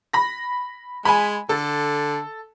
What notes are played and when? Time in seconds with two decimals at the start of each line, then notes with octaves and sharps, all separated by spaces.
0.13 B5 A#6
1.05 G#3 G#5 B5
1.49 D3 A4